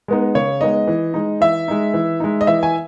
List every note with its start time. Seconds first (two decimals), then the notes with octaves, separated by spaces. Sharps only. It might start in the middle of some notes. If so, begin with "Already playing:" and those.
0.08 G#3 B3 D#4
0.35 C#3 C#5
0.61 G#3 B3 D#4 D#5
0.87 E3
1.14 G#3 D#4
1.41 E3 E5
1.68 G#3 D#4
1.94 E3
2.20 G#3 D#4
2.41 D#5
2.47 E3 E5
2.63 G#5